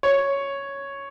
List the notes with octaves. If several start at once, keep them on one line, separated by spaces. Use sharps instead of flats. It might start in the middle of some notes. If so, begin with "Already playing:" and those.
C#5